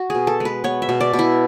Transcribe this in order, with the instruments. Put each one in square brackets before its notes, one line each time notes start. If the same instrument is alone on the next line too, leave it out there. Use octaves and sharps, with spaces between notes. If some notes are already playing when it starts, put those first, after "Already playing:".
Already playing: [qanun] F#4
B2 G#4
A4
G#3 B4
B3 C#5
E5
B2
D5
B2
E4